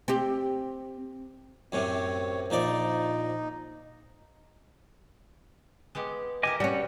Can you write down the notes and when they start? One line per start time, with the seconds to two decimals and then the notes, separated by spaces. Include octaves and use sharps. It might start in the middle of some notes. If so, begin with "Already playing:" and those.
0.08 C4 G4
1.72 F#2 A2 C3 C#5
2.50 A#1 F3 D#4 D5
5.95 G#3 B3 G4
6.43 E4 G4 A#4 D#5 G#5 D6
6.60 B2 G3 C#4 F#4 F#5